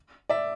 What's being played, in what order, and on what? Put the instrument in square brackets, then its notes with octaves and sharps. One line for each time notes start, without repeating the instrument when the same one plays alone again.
[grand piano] D5 E5